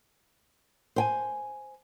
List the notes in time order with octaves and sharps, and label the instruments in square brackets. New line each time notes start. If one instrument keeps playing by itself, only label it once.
[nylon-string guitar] C5 G5 G#5